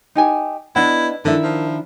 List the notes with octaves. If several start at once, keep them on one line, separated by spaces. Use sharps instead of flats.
D#4 G4 G#5
B3 D4 E4 D#5 F#5
D3 D#3 D4 E4 A#4 E5
F3